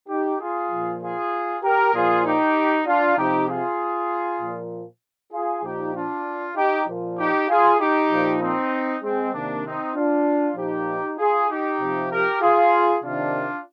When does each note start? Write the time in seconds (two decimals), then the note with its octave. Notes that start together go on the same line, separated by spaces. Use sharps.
0.09 D#4 G4
0.40 F4 G#4
0.71 A#2 F3
1.01 F4 G#4
1.63 G4 A#4
1.94 A#2 F3 F4 G#4
2.25 D#4 G4
2.86 D4 F4
3.17 C3 F3 D#4 G4
3.49 F4 G#4
4.41 A#2 F3
5.33 F4 G#4
5.64 A#2 F3 D#4 G4
5.95 D4 F4
6.56 D#4 G4
6.87 A#2 F3
7.18 D#4 G4
7.49 F4 G#4
7.79 D#4 G4
8.10 A#2 F3
8.41 C4 D#4
9.03 G#3 C4
9.33 C3 D#3 A#3 D4
9.64 C4 D#4
9.95 D4 F4
10.57 A#2 F3 D#4 G4
11.18 F4 G#4
11.49 D#4 G4
11.81 C3 F3
12.11 G4 A#4
12.42 F4 G#4
13.03 C3 D#3 D4 F4